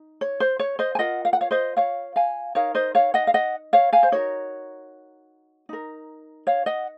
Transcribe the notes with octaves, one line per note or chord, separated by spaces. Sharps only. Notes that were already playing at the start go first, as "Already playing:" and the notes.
Already playing: D#4
C#5
C5
C#5
C5 D#5
G#5
F4 A#4 D#5 F#5
F5
F#5
C#5 F5
C5 D#5
C#5 F5
F5 G#5
D#4 A#4 C#5 F5
C5 D#5
C#5 F5
D#5 F#5
F5
D#5 F#5
C#5 F5
F5 G#5
C5
D#4 F#4 A#4 C#5
D#4 A#4
C#5 F5
D#5 F#5